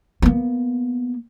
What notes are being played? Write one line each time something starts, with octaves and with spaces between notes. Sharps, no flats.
A#3 B3